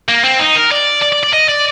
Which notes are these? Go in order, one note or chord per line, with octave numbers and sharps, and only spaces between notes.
A#3
C4
D#4
A#4
D5
D5
D5
D5
D#5
D5